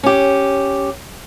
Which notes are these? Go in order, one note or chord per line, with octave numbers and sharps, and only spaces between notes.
C#4 G4